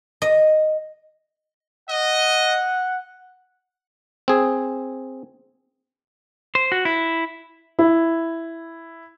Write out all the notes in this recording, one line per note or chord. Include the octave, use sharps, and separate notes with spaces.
D#5
D#5 F#5
C4 G#4
C5
F#4
E4
E4